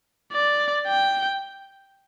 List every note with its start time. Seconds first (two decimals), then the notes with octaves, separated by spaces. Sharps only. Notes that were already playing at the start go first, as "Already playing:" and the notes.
0.33 D5
0.88 G5